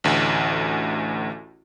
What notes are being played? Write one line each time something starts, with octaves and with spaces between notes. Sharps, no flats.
A1 D2